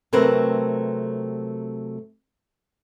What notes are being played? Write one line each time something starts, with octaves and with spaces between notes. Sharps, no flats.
C3 F#3 A3 C4 A#4 B4